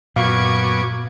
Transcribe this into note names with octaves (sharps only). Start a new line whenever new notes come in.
F#2 A#2 B3 F5 C#6 D6 G#6